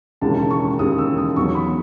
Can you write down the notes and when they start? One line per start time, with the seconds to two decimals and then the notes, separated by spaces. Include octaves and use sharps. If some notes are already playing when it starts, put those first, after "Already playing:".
0.21 E1 D#2 C#3 E3 G#3 A5
0.50 C#6
0.79 E1 D#2 C#3 E3 G#3 D#6
0.98 E6
1.18 D#6
1.36 E2 D#3 F#3 B3 C#6
1.55 B5